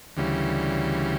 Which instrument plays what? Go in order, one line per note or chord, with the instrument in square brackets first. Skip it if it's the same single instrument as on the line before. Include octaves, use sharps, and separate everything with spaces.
[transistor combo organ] D2 C#3 E3 G3